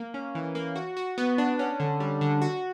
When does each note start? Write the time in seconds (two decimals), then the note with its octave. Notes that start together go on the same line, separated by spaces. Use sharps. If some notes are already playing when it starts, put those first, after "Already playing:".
Already playing: A#3
0.14 C#4
0.35 E3
0.55 A#3
0.76 F#4
0.97 F#4
1.18 B3
1.38 D4
1.59 C#4
1.80 D3
2.00 G3
2.21 D3
2.42 F#4